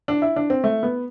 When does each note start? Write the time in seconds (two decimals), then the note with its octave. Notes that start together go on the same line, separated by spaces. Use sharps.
0.08 D4
0.22 E4
0.36 D4
0.50 C4
0.64 A3
0.83 B3